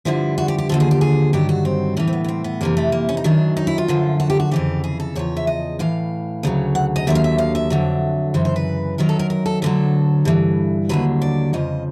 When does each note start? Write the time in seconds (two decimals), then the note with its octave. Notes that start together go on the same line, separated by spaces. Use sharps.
0.05 G2 D3 F3 E4
0.38 F#4
0.48 G4
0.58 G4
0.69 D#2 D3 F3 A4
0.80 G#4
0.91 G4
1.01 G#4
1.33 G2 D#3 F#3 G4
1.49 F#4
1.65 C4
1.97 A2 E3 C#4
2.08 C4
2.13 B3
2.24 B3
2.28 C4
2.44 B3
2.61 F2 C3 E3 A#3
2.77 A3
2.92 A#3
3.09 C#4
3.17 D#4
3.24 F#2 D#3 F#3 D4
3.57 D#4
3.67 E4
3.78 F4
3.88 F#2 D3 F3
4.20 F#4
4.30 G4
4.40 F#4
4.51 F2 C#3 E3 G4
4.84 G#4
5.00 A4
5.16 E2 C#3 F3 C#5
5.37 E5
5.47 D#5
5.79 A2 E3 F5
6.43 D2 C#3 F#3
6.75 F#5
6.96 D#5
7.07 D#2 D3 F#3 E5
7.15 F5
7.24 E5
7.38 F5
7.55 E5
7.70 F2 D3 F#3
8.34 F#2 C#3 E3 C5
8.45 C5
8.56 B4
8.98 F#2 D#3 F#3 A#4
9.09 A4
9.19 A#4
9.30 A#4
9.46 A4
9.62 D2 D3 F#3 A4
10.25 G2 E3
10.89 D#2 D3 F#3 B4
11.22 D5
11.53 F2 C#3 F3 D#5